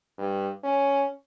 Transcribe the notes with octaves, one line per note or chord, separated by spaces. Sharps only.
G2
C#4